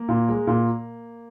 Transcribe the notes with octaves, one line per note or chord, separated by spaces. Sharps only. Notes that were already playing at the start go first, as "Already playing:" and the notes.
Already playing: A#3
A#2
G#3
A#2